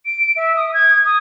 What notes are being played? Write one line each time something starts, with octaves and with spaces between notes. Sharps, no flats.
D7
E5
D#6
G#6
D#6